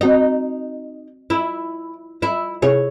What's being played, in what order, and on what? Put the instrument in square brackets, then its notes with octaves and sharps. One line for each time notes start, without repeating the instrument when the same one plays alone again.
[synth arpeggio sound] C4 F#4 D#5 [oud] D#4
[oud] E4
E4
[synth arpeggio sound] C3 E4 G#4 [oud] C#5